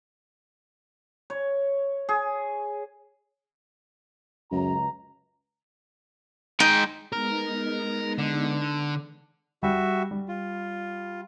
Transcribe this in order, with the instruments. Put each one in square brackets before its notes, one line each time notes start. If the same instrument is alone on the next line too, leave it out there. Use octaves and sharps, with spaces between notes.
[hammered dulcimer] C#5
G#4
[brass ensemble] C#2 A#5 [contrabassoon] F#2
[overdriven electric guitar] G#3 G5 [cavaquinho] D#4
[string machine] G#3 B3 D#4 [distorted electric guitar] A#4
[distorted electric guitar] D3
[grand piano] G3 G4 G5 [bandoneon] F#4 E5
[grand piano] G3
[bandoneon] F4